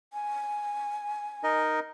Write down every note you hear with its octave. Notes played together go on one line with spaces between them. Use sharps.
G#5
D#4 A#4 D#5